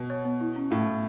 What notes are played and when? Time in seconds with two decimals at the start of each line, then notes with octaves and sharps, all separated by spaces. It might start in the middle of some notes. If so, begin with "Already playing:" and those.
Already playing: B2
0.10 C#5
0.25 B3
0.41 E4
0.56 C#4
0.71 A2 A3
0.87 A3